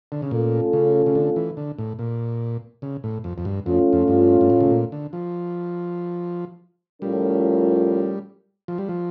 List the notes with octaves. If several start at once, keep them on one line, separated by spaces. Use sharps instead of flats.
D3
C#3
A#2 A3 C#4 F4 A4
C#3
C#3
D3
E3
D3
A2
A#2
C#3
A2
F2
F2
G2
F2 A3 C#4 F4
F2
G2
G2
A2
C#3
A#2
D3
F3
A2 F3 G3 C#4 F4 A#4
F3
G3
F3